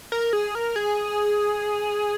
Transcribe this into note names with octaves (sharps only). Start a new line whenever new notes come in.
A#4
G#4
A#4
G#4